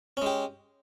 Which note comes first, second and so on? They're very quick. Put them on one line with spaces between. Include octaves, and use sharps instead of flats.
C#4 G#3 G4